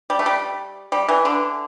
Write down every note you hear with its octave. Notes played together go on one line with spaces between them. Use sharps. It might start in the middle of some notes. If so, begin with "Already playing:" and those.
G3
A3
G3
G3
E3
D3